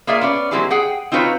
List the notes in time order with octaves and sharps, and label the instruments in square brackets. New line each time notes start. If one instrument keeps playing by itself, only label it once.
[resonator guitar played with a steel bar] A#3 F4 G#4 D5 E5 F5
B3 C#4 D5
F#3 A#3 C4 E4 G4 G#4
G#4 F#5 G5
C4 D#4 F4 F#4 B4 C#5